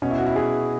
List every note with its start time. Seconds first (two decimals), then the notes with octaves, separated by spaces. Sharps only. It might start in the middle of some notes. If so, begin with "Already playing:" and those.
0.02 B2 C#4
0.11 E4
0.18 F#4
0.27 E4
0.36 G#4